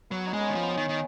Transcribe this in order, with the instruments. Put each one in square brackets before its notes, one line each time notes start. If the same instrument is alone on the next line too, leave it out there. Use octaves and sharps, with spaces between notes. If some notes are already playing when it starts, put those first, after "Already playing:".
[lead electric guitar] F#3 [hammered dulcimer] B3
[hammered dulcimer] D#4
[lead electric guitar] G#3 [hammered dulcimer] C#4
[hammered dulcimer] B3
[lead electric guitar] D#3
F3
[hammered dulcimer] B3
C#4
[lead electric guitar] D#3
D#3